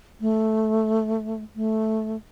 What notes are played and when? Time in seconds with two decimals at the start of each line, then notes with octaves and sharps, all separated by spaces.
0.21 A3
1.56 A3